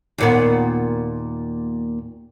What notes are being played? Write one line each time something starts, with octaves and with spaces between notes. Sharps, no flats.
D#2 A#2 B3